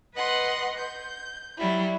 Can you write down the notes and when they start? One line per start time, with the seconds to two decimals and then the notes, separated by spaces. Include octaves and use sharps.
0.14 B4 D#5 F#5 C6
0.78 G6
1.57 F#3 G3 E4